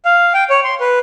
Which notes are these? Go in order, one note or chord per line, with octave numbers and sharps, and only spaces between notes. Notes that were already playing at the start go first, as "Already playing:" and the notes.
F5
G5
C#5
C6
B4